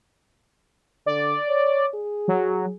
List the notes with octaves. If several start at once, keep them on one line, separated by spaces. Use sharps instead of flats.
D3 D5
C#5
G#4
F#3